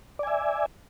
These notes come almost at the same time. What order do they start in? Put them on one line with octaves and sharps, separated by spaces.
D5 G#5 E5